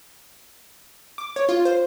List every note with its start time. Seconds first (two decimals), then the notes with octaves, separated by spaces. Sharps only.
1.18 D6
1.36 C#5
1.49 F4
1.65 C5